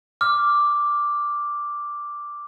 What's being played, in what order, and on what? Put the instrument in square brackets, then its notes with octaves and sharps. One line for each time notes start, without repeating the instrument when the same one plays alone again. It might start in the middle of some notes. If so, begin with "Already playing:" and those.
[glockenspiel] D6 F6